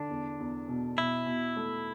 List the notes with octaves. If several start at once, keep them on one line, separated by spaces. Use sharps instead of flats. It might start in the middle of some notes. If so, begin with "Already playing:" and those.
Already playing: D3 D4
E2
E2
B2
B2 E4
B2
A3